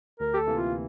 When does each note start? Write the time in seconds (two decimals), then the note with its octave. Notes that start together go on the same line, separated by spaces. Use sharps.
0.20 D2 A#4
0.34 G4
0.37 A4
0.47 C3 E3 A#3
0.55 F4